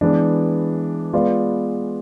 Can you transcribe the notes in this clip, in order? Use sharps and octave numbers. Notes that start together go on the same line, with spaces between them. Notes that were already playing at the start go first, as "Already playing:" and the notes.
E3 G#3 B3 D4
G#3 B3 F4 B4 D5